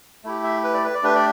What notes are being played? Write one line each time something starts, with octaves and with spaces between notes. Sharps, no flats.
A3 E4 G4
E5
B4
D5
B4
D5
A3 D4 G4 B4
D5